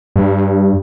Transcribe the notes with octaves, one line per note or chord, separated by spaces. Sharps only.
G2